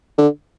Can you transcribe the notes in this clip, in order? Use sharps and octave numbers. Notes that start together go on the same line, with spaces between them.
D3